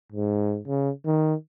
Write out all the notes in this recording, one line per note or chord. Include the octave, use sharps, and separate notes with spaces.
G#2
C#3
D#3